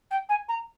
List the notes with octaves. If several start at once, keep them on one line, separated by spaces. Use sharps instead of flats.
G5
G#5
A#5